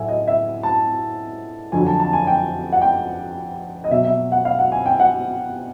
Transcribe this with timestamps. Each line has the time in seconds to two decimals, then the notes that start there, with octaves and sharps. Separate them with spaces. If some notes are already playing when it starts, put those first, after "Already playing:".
Already playing: A2 F#3 E5 G#5
0.08 D#5
0.28 E5
0.63 A5
1.72 F2 D3 F#3 G#5
1.87 A5
2.00 A5
2.13 G#5
2.27 G5
2.72 F#5
2.81 G5
3.84 D#5
3.91 B2 F#3 E5
4.05 E5
4.32 F#5
4.45 F5
4.59 F#5
4.72 G#5
4.86 G5
5.00 F#5